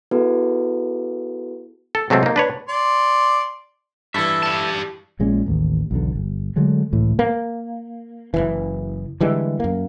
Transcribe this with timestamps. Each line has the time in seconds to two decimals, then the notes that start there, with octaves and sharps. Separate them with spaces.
0.11 B3 E4 F#4 G#4 A4 B4
1.95 A4
2.10 C3 F#3 G#3 A3 C4
2.23 A#3 D#4
2.36 D4 B4 C#5
2.69 D5 C6
4.14 G2 E3 E4 A4 E5
4.43 G4 A5
5.19 A#1 A#2 G#3 C#4
5.46 A1 D#2
5.91 B1 E2 D3
6.15 G1
6.56 D3 F#3 G#3 A3
6.92 C#2 A2 E3
7.19 A#3
8.34 F#1 B1 E3
9.21 D3 E3 G3 G#3
9.60 F#2 A#3